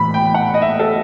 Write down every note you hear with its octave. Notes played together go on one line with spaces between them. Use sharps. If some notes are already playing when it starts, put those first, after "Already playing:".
Already playing: A2 E3 B5
G5
F#5
D#5
E5
A4